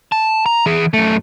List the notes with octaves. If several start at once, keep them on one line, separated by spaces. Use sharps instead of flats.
A5
A#5
E3 G#4
F#2 A3